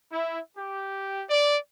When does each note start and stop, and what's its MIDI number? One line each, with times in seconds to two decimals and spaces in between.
0.12 0.39 64
0.57 1.23 67
1.30 1.57 74